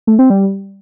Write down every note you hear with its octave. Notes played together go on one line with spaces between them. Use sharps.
A3
C4
G3